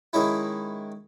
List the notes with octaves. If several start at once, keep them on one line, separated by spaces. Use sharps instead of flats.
D#3 G#3 C#4 E4